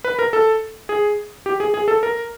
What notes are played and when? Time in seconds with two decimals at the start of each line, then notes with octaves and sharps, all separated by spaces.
0.04 B4
0.19 A#4
0.33 A4
0.89 G#4
1.46 G4
1.60 G#4
1.74 G#4
1.88 A4
2.03 A#4